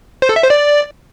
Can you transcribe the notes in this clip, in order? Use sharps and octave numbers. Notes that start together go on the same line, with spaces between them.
C5
A4
E5
C5
D5